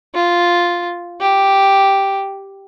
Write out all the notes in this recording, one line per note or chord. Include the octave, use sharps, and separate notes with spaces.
F4
G4